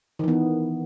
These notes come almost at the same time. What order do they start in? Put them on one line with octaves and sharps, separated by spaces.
D#3 E3 B3